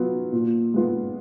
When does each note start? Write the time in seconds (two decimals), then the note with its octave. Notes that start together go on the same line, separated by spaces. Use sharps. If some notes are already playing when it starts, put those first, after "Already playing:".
Already playing: F#3 B3 F4
0.33 A#2
0.74 G#3 B3 F4